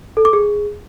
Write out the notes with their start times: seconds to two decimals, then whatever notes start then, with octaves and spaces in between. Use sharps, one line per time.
0.17 A4
0.25 D6
0.33 G#4